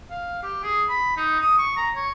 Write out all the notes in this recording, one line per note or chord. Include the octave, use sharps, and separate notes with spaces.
F5
G4
G#4
B5
D#4
D#6
C#6
A#5
C#5